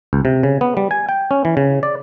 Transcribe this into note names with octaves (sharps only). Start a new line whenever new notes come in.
C#2
C3
C#3
B3
G3
G#5
G5
C#4
E3
C#3
D5